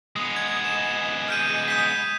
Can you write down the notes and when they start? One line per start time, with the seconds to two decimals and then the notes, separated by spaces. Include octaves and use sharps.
0.16 G#3 B3 D#6 F7
0.36 G#6
0.64 E7
1.28 F6 G6 D#7
1.68 D#6 G6 B6